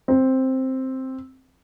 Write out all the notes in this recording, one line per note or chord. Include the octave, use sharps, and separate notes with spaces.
C4